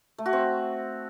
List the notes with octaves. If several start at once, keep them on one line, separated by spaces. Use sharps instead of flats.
A3
F#4
C4